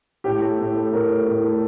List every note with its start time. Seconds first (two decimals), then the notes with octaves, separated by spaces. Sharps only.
0.24 A2 G4
0.41 A3
0.59 A2
0.75 A3
0.92 A2 A#4
1.10 A3
1.27 A2
1.44 A3